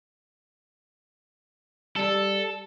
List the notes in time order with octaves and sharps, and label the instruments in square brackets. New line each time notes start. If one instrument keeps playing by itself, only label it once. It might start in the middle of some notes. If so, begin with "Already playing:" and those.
[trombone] G3 [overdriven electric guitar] A4